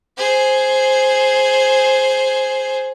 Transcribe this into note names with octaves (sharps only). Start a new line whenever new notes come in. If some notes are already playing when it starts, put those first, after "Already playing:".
G#4 C5